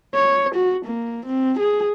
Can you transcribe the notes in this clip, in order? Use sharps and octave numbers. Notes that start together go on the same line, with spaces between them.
C#5
F#4
A#3
C4
G#4